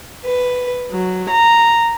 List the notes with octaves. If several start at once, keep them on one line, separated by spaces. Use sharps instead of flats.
B4
F#3
A#5